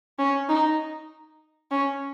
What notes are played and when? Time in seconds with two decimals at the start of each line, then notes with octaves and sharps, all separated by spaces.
0.19 C#4
0.49 D#4
1.71 C#4